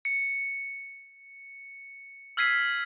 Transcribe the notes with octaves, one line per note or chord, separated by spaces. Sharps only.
C#7
E6 F6 G#6 B6 C7 D#7